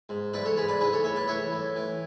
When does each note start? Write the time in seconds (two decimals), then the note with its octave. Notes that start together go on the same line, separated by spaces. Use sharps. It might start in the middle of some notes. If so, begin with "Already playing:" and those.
0.09 G#2
0.33 E3 B4 D5
0.45 A4 C#5
0.57 G#2 G#4 B4
0.68 B4 D5
0.80 E3 G#4 B4
0.93 A4 C#5
1.04 A2 C#5 E5
1.16 B4 D5
1.28 E3 C#5 E5
1.52 A2
1.76 E3